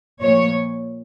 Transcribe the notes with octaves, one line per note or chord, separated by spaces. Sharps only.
A#2 F3 C#5